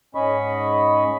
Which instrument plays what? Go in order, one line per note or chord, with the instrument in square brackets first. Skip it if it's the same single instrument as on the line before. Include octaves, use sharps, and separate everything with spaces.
[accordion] G#2 C#4 D#5 B5 C#6